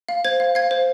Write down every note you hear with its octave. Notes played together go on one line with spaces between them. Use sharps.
F5
C5 G#6
F5
F5 G#6
C5